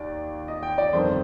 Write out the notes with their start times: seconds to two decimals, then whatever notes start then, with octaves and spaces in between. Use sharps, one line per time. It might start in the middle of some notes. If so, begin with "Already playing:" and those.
Already playing: D#2 D#3 D5
0.48 D#5
0.63 G5
0.78 D5
0.93 G1 F2 D#3 C5